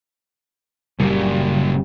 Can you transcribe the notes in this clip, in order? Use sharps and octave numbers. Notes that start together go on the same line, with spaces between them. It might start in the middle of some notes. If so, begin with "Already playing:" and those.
F#1 A#2 C#3 G3 A#3